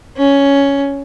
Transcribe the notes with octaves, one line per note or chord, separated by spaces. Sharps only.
C#4